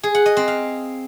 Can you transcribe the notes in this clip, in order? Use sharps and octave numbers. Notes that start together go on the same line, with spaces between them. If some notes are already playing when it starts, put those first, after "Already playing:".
G#4
F#5
D#5
C4
F5